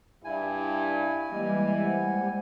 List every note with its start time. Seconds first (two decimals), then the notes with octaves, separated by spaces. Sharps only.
0.25 G2 E4 G#5
1.32 E3 G3 G#3 A#3 D#5
1.84 G#3 C5 F#5